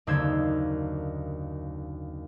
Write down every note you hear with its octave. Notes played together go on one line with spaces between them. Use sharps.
F#1 D#2 D3 C5 E6 G#6